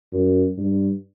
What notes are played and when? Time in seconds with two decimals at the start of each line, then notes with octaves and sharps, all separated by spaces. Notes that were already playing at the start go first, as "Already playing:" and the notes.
0.13 F#2
0.58 G2